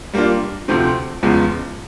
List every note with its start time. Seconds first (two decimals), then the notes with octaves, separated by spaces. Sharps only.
0.13 G3 A#3 D4 F4
0.68 D2 C3 F3 A3 C4
1.23 E2 C#3 F3 G#3 B3